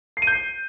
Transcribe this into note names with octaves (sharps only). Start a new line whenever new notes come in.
C7
D#7
G6
C7